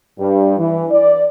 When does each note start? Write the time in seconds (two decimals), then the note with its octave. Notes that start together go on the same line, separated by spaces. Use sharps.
0.20 G2
0.58 E3
0.91 D5